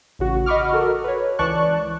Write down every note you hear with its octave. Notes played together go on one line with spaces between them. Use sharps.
A1 C#3 F#4
D#5 F#5 B5 C#6 D6 F6
F#4 A4 A#4
B4 C#5
C#2 E3 D5 A5 C#6 F#6